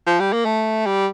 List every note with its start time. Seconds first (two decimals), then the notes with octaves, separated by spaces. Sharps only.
0.07 F3
0.20 G3
0.33 A#3
0.45 A3
0.86 G3